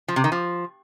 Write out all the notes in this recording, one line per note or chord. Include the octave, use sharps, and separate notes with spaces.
F3
C3
D#3
F3